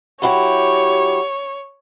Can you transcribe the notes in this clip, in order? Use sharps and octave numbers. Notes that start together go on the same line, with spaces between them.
F#3 E4 G4 C#5